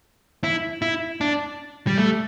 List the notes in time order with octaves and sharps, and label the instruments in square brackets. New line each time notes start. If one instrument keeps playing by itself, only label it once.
[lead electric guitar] E4
E4
D4
G3
A3